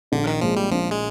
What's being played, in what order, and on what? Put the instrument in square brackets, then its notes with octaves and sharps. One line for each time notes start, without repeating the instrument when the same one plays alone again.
[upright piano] A#1 [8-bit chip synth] D3
[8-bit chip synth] D#3
[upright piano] A#2 G#3 [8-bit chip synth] F3
[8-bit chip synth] G3
[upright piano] A#1 [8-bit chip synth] F3
[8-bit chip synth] G#3